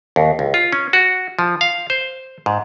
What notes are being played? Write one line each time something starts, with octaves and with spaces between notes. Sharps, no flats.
D#2
C#2
F4
C#4
F#4
F3
F5
C5
G#2